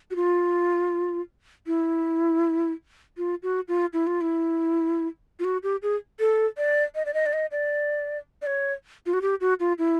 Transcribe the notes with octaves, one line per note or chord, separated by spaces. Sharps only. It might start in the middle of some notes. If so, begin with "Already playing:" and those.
F#4
F4
E4
F4
F#4
F4
E4
F4
E4
F4
F#4
G4
G#4
A4
D5
D#5
D5
D#5
D5
D#5
D5
D5
C#5
F4
F#4
G4
F#4
F4
E4